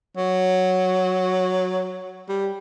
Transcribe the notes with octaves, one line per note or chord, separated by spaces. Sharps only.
F#3
G3